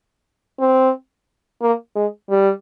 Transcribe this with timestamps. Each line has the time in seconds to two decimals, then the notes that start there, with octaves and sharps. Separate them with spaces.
0.60 C4
1.62 A#3
1.95 G#3
2.30 G3